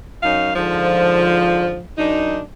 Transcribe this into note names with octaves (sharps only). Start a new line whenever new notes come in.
F#2 C#4 D#4 F5
G#2 D3 F3
F#2 D4 D#4